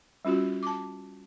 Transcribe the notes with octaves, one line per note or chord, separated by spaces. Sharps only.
G3 C#4 F4 F#4
A5 D6